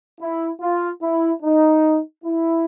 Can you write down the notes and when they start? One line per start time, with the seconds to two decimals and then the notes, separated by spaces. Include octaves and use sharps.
0.21 E4
0.61 F4
1.02 E4
1.43 D#4
2.24 E4